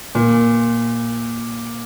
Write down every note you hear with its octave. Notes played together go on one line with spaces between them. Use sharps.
A#2